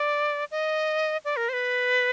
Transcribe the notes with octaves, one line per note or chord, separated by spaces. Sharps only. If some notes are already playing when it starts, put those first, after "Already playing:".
Already playing: D5
D#5
D5
A#4
C5
B4